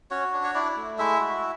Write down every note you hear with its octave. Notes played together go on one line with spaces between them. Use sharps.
C#4 F#4 C#5
D4
C#5
D4 E4 D5
A3
G#3 E4 E5
F#4